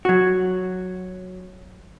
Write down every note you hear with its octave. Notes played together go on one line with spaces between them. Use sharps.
F#3 F#4